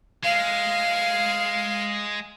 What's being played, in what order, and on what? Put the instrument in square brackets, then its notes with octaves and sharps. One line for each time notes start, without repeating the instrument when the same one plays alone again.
[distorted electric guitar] G#3 [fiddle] F5